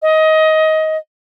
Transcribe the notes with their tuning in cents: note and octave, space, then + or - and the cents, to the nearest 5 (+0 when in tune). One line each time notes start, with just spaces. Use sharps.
D#5 +20